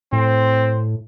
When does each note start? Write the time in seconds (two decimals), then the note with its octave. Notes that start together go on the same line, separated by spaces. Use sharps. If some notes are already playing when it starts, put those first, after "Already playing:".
0.13 A2 C4